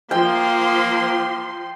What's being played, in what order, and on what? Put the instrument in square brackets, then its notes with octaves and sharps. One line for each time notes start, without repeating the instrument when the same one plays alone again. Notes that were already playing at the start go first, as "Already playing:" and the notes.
[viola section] F3 C6 [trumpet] A#3 [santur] G5